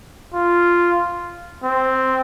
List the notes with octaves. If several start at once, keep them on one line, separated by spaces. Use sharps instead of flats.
F4
C4